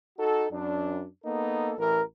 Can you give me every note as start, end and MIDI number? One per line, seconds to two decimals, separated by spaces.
0.18 0.46 63
0.18 0.46 66
0.18 0.46 69
0.51 1.06 42
0.51 1.06 62
1.24 1.73 58
1.24 1.73 59
1.24 1.73 63
1.24 1.73 69
1.77 2.02 33
1.77 2.02 52
1.77 2.02 70